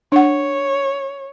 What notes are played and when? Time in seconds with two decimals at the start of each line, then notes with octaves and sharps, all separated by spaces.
0.12 D4 C#5 F#5